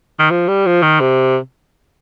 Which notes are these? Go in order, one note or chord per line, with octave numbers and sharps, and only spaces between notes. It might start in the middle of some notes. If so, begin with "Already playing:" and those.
D#3
F3
G3
F3
D#3
C3